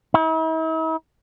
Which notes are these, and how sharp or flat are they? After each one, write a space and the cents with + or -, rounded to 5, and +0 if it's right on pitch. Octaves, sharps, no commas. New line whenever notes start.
E4 -45